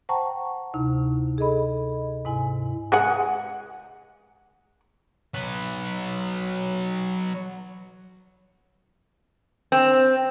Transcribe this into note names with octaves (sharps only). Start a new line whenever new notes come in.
C5 F#5 G5 A5 A#5 C#6
D2 C3 D#4 E4
G#4 A4 D#5 B5
G#2 C3 E4 G#5
G#3 G#4 F#5
F#3 B4
C4